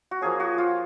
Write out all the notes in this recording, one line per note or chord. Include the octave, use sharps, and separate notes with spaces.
F#4
F3 A#3 C#4 G#4
F#4
F4